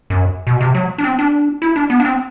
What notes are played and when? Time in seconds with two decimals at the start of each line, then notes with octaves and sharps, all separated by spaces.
0.10 F#2
0.47 B2
0.61 C3
0.75 F#3
0.98 D4
1.04 C4
1.19 D4
1.62 E4
1.76 D4
1.90 B3
2.00 D4
2.05 C4